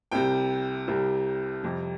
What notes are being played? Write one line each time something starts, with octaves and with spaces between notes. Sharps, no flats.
C2 C3 G3 G5
C2 C3 G3
F2 C3 G3